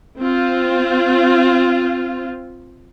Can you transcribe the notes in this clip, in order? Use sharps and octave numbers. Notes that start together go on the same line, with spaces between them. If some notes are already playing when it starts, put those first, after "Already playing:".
C4 F4